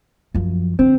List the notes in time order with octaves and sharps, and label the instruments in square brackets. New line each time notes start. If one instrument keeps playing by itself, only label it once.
[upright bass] F#2 F3
[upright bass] D3 [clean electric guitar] C4